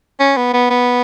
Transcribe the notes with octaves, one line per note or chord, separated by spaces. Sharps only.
C#4
B3
B3
B3